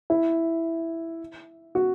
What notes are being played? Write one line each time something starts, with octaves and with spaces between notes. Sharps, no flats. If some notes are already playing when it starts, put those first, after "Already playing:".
E4
F#4